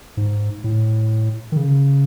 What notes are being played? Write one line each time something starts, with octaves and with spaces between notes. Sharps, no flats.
G#2
A2
D#3
C#3